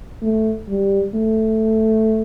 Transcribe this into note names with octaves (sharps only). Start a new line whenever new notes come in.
A3
G3
A3